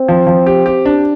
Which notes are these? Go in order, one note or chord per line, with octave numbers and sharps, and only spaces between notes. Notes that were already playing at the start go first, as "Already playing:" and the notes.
Already playing: C4
F3
F3
G4
G4
D4